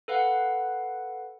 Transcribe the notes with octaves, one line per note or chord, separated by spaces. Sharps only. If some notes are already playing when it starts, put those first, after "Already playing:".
A4 B4 F5 F#5